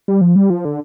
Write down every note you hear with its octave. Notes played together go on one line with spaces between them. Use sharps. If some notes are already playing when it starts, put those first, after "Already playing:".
G3
F3
G3
F3
D3